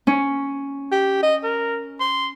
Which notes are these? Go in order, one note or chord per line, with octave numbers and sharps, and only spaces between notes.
C#4
G4
D#5
A#4
C6